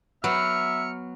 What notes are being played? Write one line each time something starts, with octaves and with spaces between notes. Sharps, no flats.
F#3 B3 E5 F6 C#7